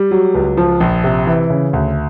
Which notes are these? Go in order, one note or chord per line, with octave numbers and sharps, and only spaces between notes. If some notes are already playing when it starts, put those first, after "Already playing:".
Already playing: G3
F#3
C#2
F3
A#1
C3
E3
C#3
D2